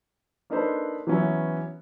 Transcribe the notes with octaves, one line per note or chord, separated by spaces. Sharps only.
A#3 D4 D#4 A4 B4 C5
E3 F#3 B3 C#4 E4 E5